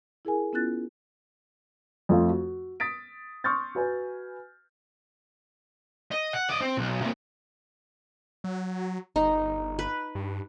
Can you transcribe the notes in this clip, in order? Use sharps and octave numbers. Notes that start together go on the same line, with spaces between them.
E4 G#4 A#4 G#5
B3 C#4 E4 F4 F#6 A6
F2 F3 A3 F4
F#4
D#6 A6 B6 D7
C6 C#6 D#6 F6 G6 A6
F#4 B4 G#5
D#5
F#5
D5 D#5
C4
B1
C3 A#3
F#3
G1 D#4
B4
G2